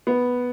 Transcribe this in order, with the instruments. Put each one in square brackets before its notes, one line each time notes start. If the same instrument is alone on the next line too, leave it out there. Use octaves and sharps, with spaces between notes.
[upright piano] B3